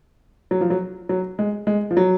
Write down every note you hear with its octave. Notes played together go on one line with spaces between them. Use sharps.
F#3
F3
F#3
F#3
G#3
G#3
F3
F#3